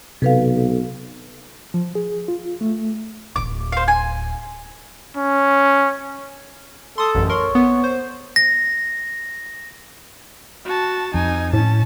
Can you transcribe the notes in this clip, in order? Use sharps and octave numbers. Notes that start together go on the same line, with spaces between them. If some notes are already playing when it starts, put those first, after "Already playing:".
B1 C3 A4 B4 F5
F3
G#4
F4
A3
D1 E4 D6
C5 F5
G#5
C#4
A4 C6 D#6
A1 F#2
A#4 C#5 C6
B3
C5
A#6
F#4 A5
F2 D#4 G#5
A2 C#4 A5